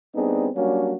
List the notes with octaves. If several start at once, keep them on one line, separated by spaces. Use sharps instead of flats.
G3 B3 C4 D4 D#4 G#4
F#3 G3 A#3 C#4 D4 F#4